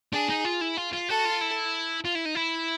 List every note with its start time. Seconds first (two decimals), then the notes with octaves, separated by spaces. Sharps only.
0.13 D4 G#4
0.29 D#4
0.45 F4
0.61 E4
0.77 F4
0.93 F4
1.09 F#4 A4
1.25 F4
1.41 E4
2.05 F4
2.15 E4
2.26 D#4
2.35 E4